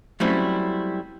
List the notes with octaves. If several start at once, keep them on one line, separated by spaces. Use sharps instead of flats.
F#3 G3 A3 C4 C#4 E4